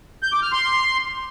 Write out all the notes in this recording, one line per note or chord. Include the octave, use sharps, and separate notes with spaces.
G6
D6
F6
C6